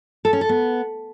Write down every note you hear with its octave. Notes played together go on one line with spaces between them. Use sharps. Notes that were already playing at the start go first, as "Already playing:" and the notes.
A4
C#4
A4
B3